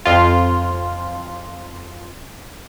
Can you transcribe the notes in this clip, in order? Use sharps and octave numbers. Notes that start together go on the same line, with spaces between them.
F2 F4